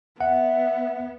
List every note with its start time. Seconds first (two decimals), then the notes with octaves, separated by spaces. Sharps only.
0.21 B3 E5 F#5